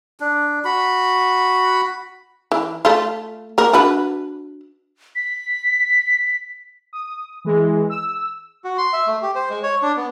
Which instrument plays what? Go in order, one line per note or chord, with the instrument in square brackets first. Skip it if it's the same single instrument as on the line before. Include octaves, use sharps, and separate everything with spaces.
[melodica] D4
F#4 B5
[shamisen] E3
A3 F4
A#3 A#4
D4 F#4 B4
[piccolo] B6
[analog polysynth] D#6
E3 G#3
E6
[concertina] F#4
C6
E5
A3
G4
C5
G#3
C#5
D4
B3